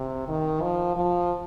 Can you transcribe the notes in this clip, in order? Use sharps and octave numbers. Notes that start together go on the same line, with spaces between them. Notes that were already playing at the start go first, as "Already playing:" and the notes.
Already playing: C3
D#3
F3
F3